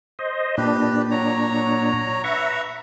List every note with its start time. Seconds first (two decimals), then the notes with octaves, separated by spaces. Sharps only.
0.19 C5 D#5
0.58 A#2 D4 G4 B4
1.11 F#3 C#5 A#5
2.24 B4 E5 A#5 C#6